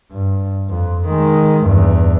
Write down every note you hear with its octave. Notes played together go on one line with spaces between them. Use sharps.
G2
F2
D#3 G#3
E2 G2